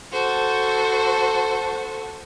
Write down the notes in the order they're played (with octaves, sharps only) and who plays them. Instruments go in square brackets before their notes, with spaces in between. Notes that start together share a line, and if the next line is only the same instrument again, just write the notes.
[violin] F#4 C5 [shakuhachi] A4